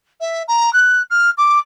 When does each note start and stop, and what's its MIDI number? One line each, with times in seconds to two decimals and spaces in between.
0.21 0.43 76
0.48 0.72 82
0.73 1.02 90
1.10 1.30 89
1.37 1.58 86